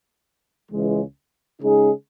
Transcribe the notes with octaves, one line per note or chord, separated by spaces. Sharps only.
C#2 C#3 E3 G#3
C#3 G#3 D#4 G#4